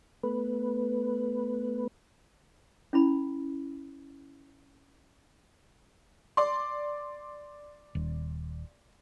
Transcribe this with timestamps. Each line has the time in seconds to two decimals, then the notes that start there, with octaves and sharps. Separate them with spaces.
0.23 A3 B3 B4
2.93 C#4 E4 B5
6.37 D5 C6
7.95 D#1